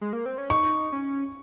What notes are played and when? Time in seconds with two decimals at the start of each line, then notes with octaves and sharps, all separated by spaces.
0.01 G#3
0.13 A#3
0.26 C4
0.38 C#4
0.50 D#4 C#6
0.92 C#4